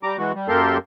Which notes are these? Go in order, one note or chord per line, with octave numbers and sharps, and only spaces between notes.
G3 A#5 D6
E3 G#3 F#4
G3
F#2 A#3 G4 A4 A#4 C6